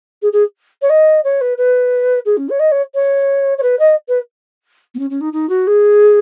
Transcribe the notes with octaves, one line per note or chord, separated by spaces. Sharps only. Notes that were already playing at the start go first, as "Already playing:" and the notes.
G#4
G#4
C#5
D#5
C#5
B4
B4
G#4
C#4
C#5
D#5
C#5
C#5
C#5
B4
D#5
B4
B3
C#4
C#4
D#4
D#4
F#4
G#4